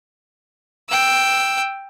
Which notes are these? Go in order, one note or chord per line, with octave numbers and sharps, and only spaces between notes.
G5 E6